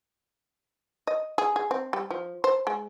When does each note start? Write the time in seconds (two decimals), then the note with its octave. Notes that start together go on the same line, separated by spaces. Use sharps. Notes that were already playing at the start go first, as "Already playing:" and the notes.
1.07 D#5
1.38 G#4
1.56 G#4
1.71 C4
1.93 G3
2.11 F3
2.44 C5
2.67 G#3